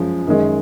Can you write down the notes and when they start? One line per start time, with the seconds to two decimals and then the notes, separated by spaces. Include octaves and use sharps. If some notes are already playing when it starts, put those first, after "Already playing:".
Already playing: F#2 F3 G#3
0.27 F#2 D#3 G#3